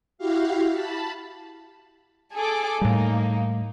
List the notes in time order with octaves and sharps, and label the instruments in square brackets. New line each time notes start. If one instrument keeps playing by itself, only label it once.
[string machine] E4 F#4 G4 F5
A5 B5
[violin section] G#4 A4 D6
[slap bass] A2 G3 [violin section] A#3 D#4